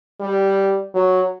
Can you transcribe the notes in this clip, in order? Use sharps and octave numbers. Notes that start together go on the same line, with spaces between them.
G3
F#3